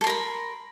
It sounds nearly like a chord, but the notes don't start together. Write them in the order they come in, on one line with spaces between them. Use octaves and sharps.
A4 C6 A#4 B5